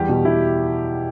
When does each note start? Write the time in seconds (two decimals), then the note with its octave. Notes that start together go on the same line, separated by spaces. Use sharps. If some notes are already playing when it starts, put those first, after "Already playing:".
Already playing: E2 G3 G4
0.09 B2
0.25 B2 E4